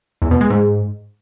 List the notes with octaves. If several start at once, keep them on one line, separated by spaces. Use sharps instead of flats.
E2
B2
G#3
G#2